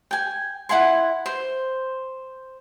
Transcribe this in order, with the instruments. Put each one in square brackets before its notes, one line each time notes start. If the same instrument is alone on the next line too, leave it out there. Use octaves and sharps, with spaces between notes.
[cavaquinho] G5 G#5
E4 F#5 G#5 C6
C5